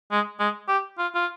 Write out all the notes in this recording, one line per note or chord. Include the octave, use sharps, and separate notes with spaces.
G#3
G#3
G4
F4
F4